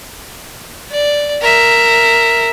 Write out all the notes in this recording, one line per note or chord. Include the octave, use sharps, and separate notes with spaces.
D5
A#4 E5